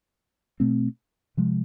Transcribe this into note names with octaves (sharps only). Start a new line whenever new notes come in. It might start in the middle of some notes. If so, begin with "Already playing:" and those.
B2 A3 C4
C3 F3 G#3